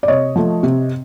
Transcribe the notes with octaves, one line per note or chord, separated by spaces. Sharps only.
D5
C3 C#5 D#5
F3 A3
C3